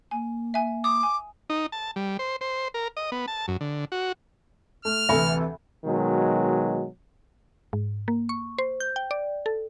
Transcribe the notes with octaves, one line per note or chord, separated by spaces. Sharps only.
A#3 G#5
E5 G#5
D6 D#6
G#5
D#4
A5
G3
C5
C5
A#4
D#5
B3
A5
F#2
D3
F#4
A3 F6
D2 C3 E3 A4 E5 G#5 B5
B2 D#3 F#3 G#3
G#2
A#3
C#6
C5
G6
G5
D5
A4